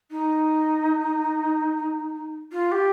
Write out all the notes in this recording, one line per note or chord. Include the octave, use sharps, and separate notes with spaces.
D#4
F4
G4